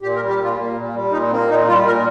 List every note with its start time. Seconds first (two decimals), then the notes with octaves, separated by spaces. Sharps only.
0.02 A#2 G4
0.16 A#4
0.20 G3
0.29 G4
0.39 A#2 F4
0.57 A#3
0.76 A#2
0.94 G3
1.12 A#2 D#4
1.31 A#3 C4
1.49 A#2 D#4
1.68 G3 F4
1.86 A#2 A#4